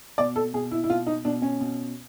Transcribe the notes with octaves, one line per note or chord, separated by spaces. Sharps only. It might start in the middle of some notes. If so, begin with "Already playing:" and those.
B2 D5
A4
B2 G#4
E4
E4
B2 F4
D#4
B2 D4
C#4
B2